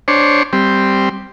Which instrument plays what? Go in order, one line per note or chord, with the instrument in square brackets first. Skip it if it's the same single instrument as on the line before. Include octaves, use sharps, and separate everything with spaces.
[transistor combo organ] D4 C5 C#5
G3 C4